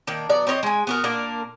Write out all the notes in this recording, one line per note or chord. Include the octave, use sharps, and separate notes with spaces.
D#3 A#3 D4
F#3 B3 D5
C4 C5 C#5 D#5
G#3 G#5
B3 F#4 A#4
A#2 A#3 D4 A#4